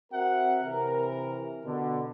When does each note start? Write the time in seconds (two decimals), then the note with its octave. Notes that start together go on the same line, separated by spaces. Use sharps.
0.13 C4 F#4 A#4 E5 F#5
0.62 C3 E3 A#4
1.65 B2 D3